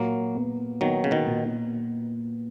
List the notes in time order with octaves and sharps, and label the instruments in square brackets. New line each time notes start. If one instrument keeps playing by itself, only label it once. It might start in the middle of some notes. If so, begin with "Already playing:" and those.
Already playing: [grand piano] A#2 [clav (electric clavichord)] F#3 A#3
[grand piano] B3
[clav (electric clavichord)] D#3 F#3 [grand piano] B3
[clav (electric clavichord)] C#3
B2 D#3
[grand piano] A#2